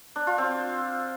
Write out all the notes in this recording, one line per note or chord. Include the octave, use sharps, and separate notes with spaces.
D4
F4
C4